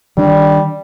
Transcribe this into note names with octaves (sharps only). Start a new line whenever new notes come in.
D#3 G3 D4